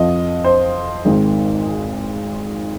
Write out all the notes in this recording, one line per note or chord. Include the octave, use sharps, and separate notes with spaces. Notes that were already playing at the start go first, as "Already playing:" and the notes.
Already playing: F2 F3 C4 D#5
C5
G#1 G#2 D#3 G#3 C4
G#4